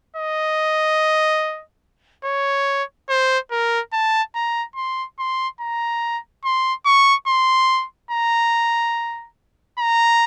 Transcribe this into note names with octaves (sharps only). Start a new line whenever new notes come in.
D#5
C#5
C5
A#4
A5
A#5
C6
C6
A#5
C6
C#6
C6
A#5
A#5